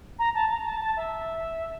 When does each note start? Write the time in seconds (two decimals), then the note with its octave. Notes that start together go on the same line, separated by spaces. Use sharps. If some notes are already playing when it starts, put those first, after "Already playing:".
0.19 A#5
0.35 A5
0.51 A#5
0.65 A5
0.80 A5
0.97 E5